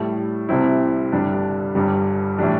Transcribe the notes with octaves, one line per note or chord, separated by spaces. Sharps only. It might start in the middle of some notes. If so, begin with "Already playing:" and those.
Already playing: A2 G3 E4 A4
C2 C3 G3 C4 E4
G1 G2 G3 D4
G1 G2 G3
A2 E3 G3 D4